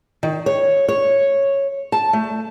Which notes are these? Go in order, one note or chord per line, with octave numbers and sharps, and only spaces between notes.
D#3
C#5
C#5
A5
A3